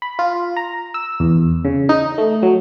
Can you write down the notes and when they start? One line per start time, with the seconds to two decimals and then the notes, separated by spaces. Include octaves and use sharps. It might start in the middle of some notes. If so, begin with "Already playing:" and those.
0.02 B5
0.19 F4
0.57 A#5
0.94 E6
1.20 E2
1.65 C#3
1.89 D#4
2.18 A3
2.43 F#3